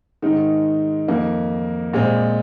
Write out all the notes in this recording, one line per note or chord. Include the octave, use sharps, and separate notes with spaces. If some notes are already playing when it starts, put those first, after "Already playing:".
G#2 D#3 G#3 D#4
F2 D#3 A#3 D#4
A#2 G#3 C4